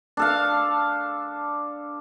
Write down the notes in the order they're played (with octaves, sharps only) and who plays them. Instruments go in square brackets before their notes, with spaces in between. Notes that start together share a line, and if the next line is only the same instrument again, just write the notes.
[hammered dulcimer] D4 A4 F5